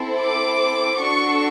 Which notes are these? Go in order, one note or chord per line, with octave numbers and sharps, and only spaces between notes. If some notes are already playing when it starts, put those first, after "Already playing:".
Already playing: C4 E4 A4
D6
D4 F#4 A4 C#6